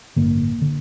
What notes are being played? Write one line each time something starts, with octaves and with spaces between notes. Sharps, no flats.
A1 G2 D3 A#3
D3